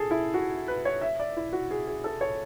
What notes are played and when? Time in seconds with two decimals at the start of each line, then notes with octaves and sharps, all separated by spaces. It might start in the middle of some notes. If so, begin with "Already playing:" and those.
Already playing: G#4 A4
0.11 E4
0.34 F#4
0.68 B4
0.85 C#5
1.01 E5
1.19 D5
1.37 E4
1.53 F#4
1.71 G#4
1.87 G#4
2.04 A4
2.21 C#5